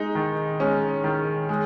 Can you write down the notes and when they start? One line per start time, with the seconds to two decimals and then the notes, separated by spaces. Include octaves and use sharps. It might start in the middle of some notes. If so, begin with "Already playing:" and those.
Already playing: G#3 D#4
0.15 D#3
0.60 G#3 C#4
1.04 D#3
1.49 G#3